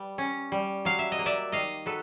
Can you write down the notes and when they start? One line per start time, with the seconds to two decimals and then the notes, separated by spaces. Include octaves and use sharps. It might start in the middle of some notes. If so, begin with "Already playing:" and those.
Already playing: G3 B4
0.18 C#4
0.52 G3
0.85 F#3 F5
0.99 E5
1.12 D#5
1.19 A#3
1.26 D5 E5
1.52 D#3 D#5 F5
1.86 F#3 A4 B4